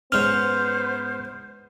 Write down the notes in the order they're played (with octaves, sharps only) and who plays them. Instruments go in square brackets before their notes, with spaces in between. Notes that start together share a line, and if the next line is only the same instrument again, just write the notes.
[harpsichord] G#2 C#4 [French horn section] B3 [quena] C5 [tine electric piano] F6